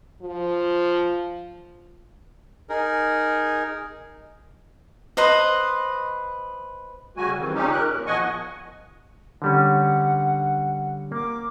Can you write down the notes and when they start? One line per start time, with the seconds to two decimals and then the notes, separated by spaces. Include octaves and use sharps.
0.22 F3
2.69 D#4 G#4 A#4
5.17 B4 C5 D#5
7.17 C#3 G3 A3 F#4 G#5
7.39 D#3 E3 G3 C4
7.55 A#2 C#3 C4 C#4 D#4 G4
7.72 A#4 F#6
7.90 A#2
8.06 E2 F3 D#5 F#5 G#5 C#6
9.42 D3 G3 C#4 F#5
11.12 A#3 D6